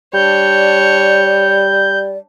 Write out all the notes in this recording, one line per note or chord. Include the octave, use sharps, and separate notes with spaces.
G3 D4 C#5 D5 G6